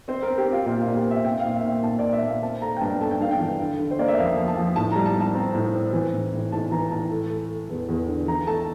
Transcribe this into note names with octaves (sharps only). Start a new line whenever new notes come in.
C4 C5
C4 A#4
G4
C4 F4
A#2 F4
F4
A#2
G4
C4 E5
C4 G5
F5
A#2
E5
A#2 G5
A#2 A5
A#2 D5
E5
A#2
F5
C4 A5
A3 A#5
G5
G2 A5
A3 A5
G5
G2 F5
G5
E3
D3
D3
C5
A#3 D5
E5
F2 F5
F3
A5
F3
A2 A5
G3 A#5
A5
G3
A5
C4 A#5
A2
C4
E3
A2
A2
A2 A5
E3 A#5
A2 A5
A3
A3
A3
E2
E2
D3
E3 A#5
A3 A5